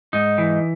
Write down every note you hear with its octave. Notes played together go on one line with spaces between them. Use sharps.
G#2 D#4
E3